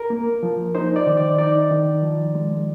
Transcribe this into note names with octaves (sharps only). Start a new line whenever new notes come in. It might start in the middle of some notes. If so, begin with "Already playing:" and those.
Already playing: A#4
A#3
F3
D#4 C5
D5
D#3
D5
D#4 D5
D#3
F3
G#3